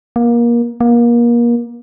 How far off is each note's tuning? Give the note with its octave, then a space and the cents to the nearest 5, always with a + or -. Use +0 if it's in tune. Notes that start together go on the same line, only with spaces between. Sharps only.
A#3 +25
A#3 +30